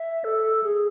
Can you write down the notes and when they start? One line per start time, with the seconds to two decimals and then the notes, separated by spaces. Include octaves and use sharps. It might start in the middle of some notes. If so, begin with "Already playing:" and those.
Already playing: E5
0.24 A4
0.64 G#4